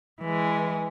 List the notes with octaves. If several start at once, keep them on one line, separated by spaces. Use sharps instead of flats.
E3 G#3